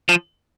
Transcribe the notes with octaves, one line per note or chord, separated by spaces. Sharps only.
F3